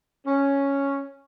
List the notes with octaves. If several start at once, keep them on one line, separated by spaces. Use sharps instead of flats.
C#4